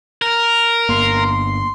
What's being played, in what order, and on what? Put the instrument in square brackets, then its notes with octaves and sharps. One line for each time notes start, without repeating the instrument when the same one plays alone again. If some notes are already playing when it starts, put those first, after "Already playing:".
[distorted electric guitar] A#4
[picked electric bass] G1 A#3 [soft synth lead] C6